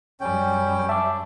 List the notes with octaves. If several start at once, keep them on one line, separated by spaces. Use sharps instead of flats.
F#2 G3 C#4 G5
E5 A5 D6